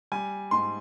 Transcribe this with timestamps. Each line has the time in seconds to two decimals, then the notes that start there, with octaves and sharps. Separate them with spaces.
0.12 G3 G#5
0.51 G#2 C6